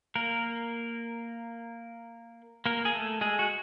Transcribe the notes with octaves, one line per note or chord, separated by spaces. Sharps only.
A#3 A#4
A#3 A#4
G#4
A3 A4
G#3 G#4
F#4